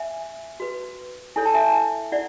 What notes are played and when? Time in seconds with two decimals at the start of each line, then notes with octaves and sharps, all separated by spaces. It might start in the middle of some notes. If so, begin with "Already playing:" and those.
Already playing: E5 G#5
0.60 F#4 B4
1.36 E4 A4 C#5 G#5
1.45 A5
1.54 E5 G#5
2.12 E4 D5 F#5